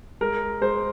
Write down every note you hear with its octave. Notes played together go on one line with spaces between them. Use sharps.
G#3 A#4
G#3 C5